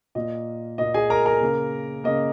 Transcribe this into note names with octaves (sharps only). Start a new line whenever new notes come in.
A#2 A#3 D#5
A#2 A#3 D#5
G#4 G#5
A#4 A#5
A#4 A#5
C#3 A#3
C#3 A#3 D#5